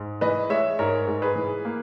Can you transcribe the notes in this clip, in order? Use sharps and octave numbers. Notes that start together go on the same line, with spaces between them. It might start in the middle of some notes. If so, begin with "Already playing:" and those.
Already playing: G#2
E3 B4 D#5
G#3 C#5 E5
G#2 A#4 C#5
G#2
G#4 B4
E3
A#3